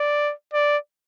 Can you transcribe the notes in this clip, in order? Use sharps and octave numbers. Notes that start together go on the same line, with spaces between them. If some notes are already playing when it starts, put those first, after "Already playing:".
Already playing: D5
D5